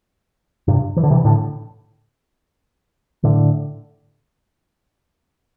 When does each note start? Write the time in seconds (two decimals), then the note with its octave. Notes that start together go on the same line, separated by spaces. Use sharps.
0.68 G2 C3
0.97 E3
1.03 D3
1.11 C3 E3
1.25 A2 D3
3.24 A2 D3